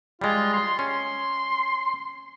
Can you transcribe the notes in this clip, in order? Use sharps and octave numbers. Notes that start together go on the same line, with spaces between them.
G3 G#3 F4
C6
C#4 C6